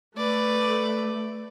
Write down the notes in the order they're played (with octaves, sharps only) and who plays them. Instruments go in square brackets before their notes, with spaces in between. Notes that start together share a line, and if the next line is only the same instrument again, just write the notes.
[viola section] A3 [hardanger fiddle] B4 D5